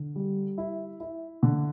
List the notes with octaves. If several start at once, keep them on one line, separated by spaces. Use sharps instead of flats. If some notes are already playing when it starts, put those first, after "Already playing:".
Already playing: D3
G3
E4
E4
D3